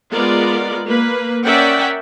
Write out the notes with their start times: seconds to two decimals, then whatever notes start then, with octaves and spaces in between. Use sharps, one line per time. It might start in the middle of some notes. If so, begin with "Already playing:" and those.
0.11 G#3 B3 F4 A#4 D5
0.86 A#3 B4
1.44 C#4 A#4 D5 E5 F#5 G5